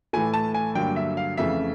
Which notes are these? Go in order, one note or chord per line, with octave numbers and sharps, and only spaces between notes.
A2 E3 A3 G#5
A5
G#5
G2 D3 F#3 A#3 G5
E5
F5
F2 C#3 E3 A3 E5